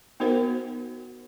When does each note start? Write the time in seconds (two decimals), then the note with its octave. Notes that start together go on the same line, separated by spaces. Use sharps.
0.20 B3 D#4 F#4 A#4 C5 F#5